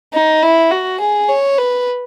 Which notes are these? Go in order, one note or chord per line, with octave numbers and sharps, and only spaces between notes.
D#4
E4
F#4
G#4
C#5
B4